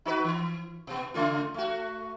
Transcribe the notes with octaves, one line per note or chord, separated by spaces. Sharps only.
D#4 F#4 B4
E3
B2 B3
C#3 A3 F4
A3 F#4